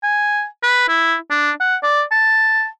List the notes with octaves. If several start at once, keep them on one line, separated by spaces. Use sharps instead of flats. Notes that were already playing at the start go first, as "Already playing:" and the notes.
G#5
B4
E4
D4
F#5
D5
A5